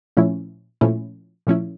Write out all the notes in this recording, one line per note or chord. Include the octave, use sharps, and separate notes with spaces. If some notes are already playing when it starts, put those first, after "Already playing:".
A#2 F3 A3 C#4 E4
A#2 F3 A3 C#4 E4
A#2 F3 A3 C#4 E4